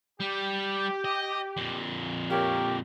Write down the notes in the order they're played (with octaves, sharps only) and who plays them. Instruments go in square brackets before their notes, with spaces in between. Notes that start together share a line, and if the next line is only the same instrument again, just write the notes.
[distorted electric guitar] G3 [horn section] G4
[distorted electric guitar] D#5
F2 A#2
[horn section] F4 A#4 C#5 [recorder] G4